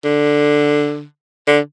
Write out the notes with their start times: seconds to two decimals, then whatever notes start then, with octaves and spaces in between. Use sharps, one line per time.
0.05 D3
1.47 D3